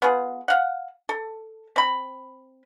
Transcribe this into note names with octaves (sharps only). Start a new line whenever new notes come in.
B3 F4 G#4
F5 F#5
A4
C4 B5